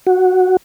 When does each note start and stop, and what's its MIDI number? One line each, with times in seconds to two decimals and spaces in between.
0.07 0.57 66